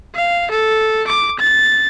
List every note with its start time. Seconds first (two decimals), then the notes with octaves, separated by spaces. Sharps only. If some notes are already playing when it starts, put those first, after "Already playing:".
0.15 F5
0.51 A4
1.07 D6
1.39 A6